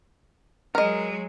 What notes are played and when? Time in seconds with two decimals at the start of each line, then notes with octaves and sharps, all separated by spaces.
0.75 F#3 G#3 A#4 D#5